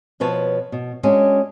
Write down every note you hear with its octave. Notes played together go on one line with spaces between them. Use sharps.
B2 F3 B4 C#5 A5
B2
G#3 C#4 D4 F#4